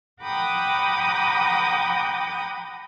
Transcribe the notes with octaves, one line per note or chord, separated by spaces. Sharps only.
F#5 G5 A#5 B5 D6 D#6